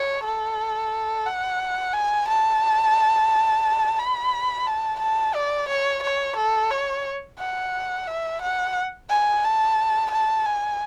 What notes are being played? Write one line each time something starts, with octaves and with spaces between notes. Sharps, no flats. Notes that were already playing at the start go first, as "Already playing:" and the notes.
Already playing: C#5
A4
F#5
G#5
A5
B5
A5
A5
D5
C#5
C#5
A4
C#5
F#5
E5
F#5
G#5
A5
A5
G#5